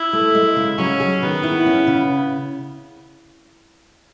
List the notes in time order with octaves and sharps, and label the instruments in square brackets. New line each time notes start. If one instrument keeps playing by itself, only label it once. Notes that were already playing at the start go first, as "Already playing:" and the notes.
Already playing: [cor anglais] E4
[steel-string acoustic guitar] A3
G#3
C#3
[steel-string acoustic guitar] F#3 [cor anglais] C#4
[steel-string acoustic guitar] G#4
[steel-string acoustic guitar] D#3 [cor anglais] B3
[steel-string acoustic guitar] E4
C#4
C#3